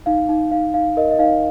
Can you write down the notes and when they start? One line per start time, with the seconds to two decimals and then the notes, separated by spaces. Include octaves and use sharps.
0.06 D#4 F5
0.29 D#4
0.52 D#4 F5
0.74 D#4 F5
0.97 A#4 D#5
1.11 D#5
1.19 D#4 F5